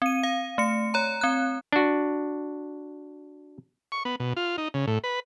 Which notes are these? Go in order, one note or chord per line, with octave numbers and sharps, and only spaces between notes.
C4 D#7
F5
A3 C#7
C#5 A#5
C4 F#6
D4 F#4
C#6
B3
B2
F4
D#4
C#3
A2
B4